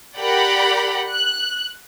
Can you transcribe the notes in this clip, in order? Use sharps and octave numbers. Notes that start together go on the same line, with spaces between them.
G4 A#4 D5 F#5 G5 B5
F#6